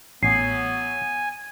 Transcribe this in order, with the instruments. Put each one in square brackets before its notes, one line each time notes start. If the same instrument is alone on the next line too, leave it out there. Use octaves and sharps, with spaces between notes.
[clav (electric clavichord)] A1 [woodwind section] F#3 B3 [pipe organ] G#5 [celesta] C7